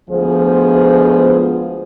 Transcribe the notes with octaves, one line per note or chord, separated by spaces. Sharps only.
D2 F3 G#3 B3 G#4 C5